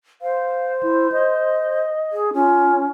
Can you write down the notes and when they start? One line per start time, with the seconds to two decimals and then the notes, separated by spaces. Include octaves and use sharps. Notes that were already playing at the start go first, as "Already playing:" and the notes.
0.22 C5 F5
0.83 E4
1.12 D#5
2.12 G#4
2.34 C#4 F4